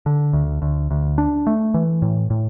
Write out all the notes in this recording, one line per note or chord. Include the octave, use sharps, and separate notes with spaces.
D3
D2
D2
D2
D4
A3
E3
A2
A2